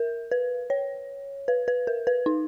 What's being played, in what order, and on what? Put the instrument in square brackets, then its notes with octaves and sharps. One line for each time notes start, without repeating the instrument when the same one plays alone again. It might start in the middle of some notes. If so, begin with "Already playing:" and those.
Already playing: [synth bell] A#4
B4
C#5
B4
B4
A#4
B4
D#4